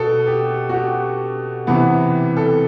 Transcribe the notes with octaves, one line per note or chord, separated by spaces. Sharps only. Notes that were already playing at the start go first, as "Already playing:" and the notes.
Already playing: B2 A4
G4
F#4
G4
C3 E3 B3
A4